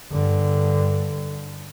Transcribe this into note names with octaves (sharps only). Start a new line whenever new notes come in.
G2 D3